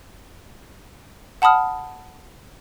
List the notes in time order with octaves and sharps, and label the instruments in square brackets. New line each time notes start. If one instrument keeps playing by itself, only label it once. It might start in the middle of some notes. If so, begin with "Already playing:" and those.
[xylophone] F#5 A5 B5 D#6 F6